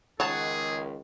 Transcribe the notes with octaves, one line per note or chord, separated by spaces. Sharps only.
C#2 D#3 G#4 C#5 F#5 A5